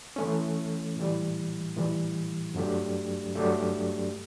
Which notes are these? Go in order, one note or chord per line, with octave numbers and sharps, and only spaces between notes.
E3 A3 C#4
A2 E3 G3
A2 E3 G3
G2 F#3 A3 D4 G4
G2 F#3 A3 D4 G4